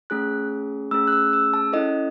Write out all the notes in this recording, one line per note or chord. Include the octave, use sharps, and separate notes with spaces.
A3 C#4 G#4 F#6
A3 C#4 G#4 E6
F#6
E6
E6
A5
C#4 E4 A4 D#5